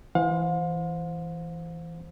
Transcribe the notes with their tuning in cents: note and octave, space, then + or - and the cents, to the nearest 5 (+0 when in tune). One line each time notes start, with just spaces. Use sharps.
E3 +0 C5 -5 F5 +40